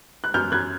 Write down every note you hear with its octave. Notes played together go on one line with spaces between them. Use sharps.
F#6
F#2 F6 G6
F#2 F#6 G#6